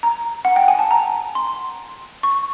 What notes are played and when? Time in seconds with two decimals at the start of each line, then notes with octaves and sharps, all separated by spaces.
0.03 A#5
0.45 F#5
0.56 G5
0.68 G#5
0.79 A5
0.91 A#5
1.35 C6
2.23 C#6